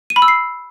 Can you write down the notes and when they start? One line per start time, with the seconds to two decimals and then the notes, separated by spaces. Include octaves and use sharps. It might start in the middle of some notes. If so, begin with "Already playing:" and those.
0.10 D#7
0.16 B5
0.22 E6
0.28 C7